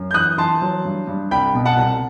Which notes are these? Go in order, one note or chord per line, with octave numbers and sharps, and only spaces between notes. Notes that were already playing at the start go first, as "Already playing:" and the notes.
Already playing: F#2
G6
E3 D#6 F#6
E3 A5 C6
F#3
G2
G2
C2 G5 B5
B2
F#5 A5
C2